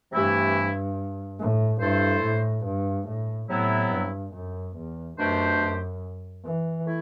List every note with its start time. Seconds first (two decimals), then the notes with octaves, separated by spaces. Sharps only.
0.12 G2 C3 E3 A3 E4 G4
1.39 A2
1.81 G2 A3 E4 A4 C5
2.23 A2
2.65 G2
3.08 A2
3.49 A2 C3 F#3 B3 E4
3.91 G2
4.34 F#2
4.76 E2
5.18 F#2 B2 A3 D4 G4 C5
5.60 F#2
6.45 E3
6.86 A3 E4